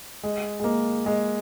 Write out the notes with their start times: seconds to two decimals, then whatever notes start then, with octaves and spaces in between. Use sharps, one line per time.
0.24 G#3
0.60 G#3
0.64 A#3
1.06 G#3